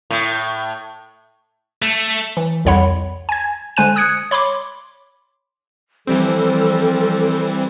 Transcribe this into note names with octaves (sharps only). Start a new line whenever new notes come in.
A2
A3
E3
C2 F2 C#5 F#5 B5
G#5 G#6
D3 G#3 C5 G#5 F#6 D#7
D#6 F#6 G#6 C#7
C#5 B5 C6 D6
E3 F3 G3 C4 A4